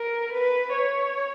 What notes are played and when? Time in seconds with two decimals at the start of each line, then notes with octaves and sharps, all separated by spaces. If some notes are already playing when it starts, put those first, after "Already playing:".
Already playing: A#4
0.32 B4
0.73 C#5